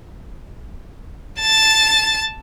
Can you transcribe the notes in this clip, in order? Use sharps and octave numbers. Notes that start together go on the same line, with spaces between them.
A5 A6